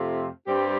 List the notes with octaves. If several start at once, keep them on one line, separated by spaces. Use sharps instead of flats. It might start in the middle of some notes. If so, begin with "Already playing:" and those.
Already playing: F2 C3 A3 C4 F4
G2 G3 C4 G4